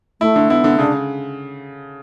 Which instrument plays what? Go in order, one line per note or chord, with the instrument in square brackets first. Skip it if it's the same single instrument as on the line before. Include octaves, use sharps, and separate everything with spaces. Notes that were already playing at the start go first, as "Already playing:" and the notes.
[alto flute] A3 [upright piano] E4
[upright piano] D3
[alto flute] B3 [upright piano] E4
[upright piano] D3
[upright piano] C#3 [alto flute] D4